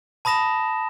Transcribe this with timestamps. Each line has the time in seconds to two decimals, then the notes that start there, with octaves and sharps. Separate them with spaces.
0.25 A5 B5 D#6 A#6 E7